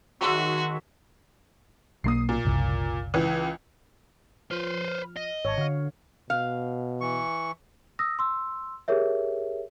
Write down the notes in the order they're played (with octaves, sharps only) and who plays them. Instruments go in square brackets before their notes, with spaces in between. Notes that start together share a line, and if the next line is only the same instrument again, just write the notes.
[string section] D#3 [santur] F#3 G#3 E5 [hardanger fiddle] F#4
[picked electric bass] B1 F3 A#3 [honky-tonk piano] D#6 C7
[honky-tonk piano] A#2
[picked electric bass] F#1 C2
[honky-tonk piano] C#2 E3
[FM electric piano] F3 F6 [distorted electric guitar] B4 C5
[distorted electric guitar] D#5
[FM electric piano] G#1 A5 [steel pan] C#5
[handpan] D3 [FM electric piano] F#4 F5
[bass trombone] B2 [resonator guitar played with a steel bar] F5
[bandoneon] E3 C#6
[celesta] D#6 E6 A#6
C6 E6
G4 G#4 A#4 C#5 E5